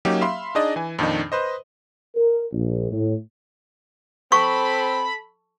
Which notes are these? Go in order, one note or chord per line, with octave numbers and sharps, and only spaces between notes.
F#3 A#3 C#4 D#4 G4
E5 F5 B5 C6
D4 D#4 G#4 D5 D#5
E3 G#5
F2 A#2 D#3 D4 D#4
B4 C5 D#5
A#4
A#1
A2
C4 A4 B5 C#6